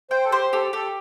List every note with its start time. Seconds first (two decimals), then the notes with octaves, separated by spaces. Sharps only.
0.10 C5 G5
0.25 A4
0.32 G4 C5
0.53 G4 A4
0.73 G4 A4